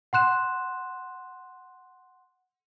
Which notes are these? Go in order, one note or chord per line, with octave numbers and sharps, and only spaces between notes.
F#5 C6 F#6 E7